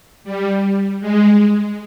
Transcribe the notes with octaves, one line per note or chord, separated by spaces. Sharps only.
G3
G#3